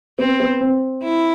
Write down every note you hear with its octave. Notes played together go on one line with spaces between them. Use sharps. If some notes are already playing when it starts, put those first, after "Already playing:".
B3 C4
B3
C4
E4